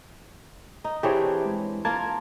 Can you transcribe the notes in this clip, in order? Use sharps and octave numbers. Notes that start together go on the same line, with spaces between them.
D#4
E3 C4 D4 G4 G#4 C#5
G#3
A#3 F4 A#4 A5 G#6